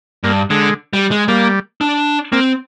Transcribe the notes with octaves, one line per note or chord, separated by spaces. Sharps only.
G2 A#3
D3 G#3
G3
G#3
G3 A#3
D4
A#3 C4